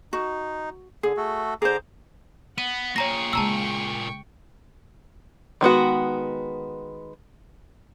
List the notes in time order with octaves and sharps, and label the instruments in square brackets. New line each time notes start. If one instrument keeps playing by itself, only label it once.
[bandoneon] D#4 [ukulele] F#4
[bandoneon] D3 [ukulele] G#4
[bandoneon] A3 F#4 A4
[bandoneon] D3 A#5 D6 [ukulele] G#4 C5
[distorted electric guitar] B3 [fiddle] F#5 [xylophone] D#7
[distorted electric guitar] A#2 G#4 [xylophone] C#5 A#5 A#6 [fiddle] G5 C#6
[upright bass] C#3 G#3 [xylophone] A5 A#5 E6
[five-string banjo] D#3 G#3 B3 F#4